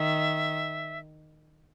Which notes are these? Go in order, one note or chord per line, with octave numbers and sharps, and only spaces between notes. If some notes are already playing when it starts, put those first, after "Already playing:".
Already playing: D#3 E5